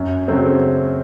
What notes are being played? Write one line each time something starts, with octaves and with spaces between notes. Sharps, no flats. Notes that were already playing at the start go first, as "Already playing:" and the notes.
Already playing: F#2
C#3 F#3 A3 C4